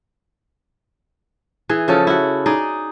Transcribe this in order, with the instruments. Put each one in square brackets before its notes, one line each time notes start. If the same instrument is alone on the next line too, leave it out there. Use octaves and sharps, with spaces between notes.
[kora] E3 G#4
C#3 F3 C#4 A4
E4 F#4
D#4 G#4 D5